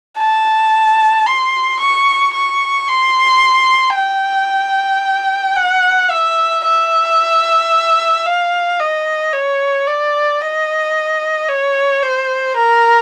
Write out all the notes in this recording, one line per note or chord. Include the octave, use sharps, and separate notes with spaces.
A5
C6
C#6
C#6
C6
G5
F#5
E5
E5
F5
D#5
C#5
D5
D#5
C#5
C5
A#4